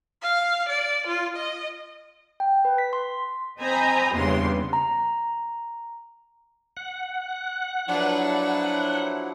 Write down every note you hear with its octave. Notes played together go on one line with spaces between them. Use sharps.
F5
D5
F4
D#5
G5
B4
B6
C6
C4 C5 D#5 G#5 A#5 B5
E2 G2 C#3 A#3 B3 C6
A#5
F#5
F3 F#3 D4 E4 B4